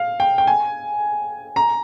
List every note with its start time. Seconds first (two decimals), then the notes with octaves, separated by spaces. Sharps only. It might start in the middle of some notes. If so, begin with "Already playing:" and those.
Already playing: F5
0.20 G5
0.38 G5
0.47 G#5
1.56 A#5